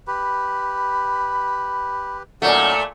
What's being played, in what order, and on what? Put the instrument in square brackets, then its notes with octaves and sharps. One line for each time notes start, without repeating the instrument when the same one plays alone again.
[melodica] G4 B4 [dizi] B5
[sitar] A#2 A3 [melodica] F#3 C#4 D#4 [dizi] F#5